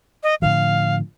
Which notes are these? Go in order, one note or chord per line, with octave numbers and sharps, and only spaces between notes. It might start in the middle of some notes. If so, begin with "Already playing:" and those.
D#5
A2 D3 F3 F5